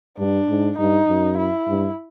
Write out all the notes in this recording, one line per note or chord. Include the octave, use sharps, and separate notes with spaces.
G2 D4
G#2
G2 D#4
F#2
E4
G2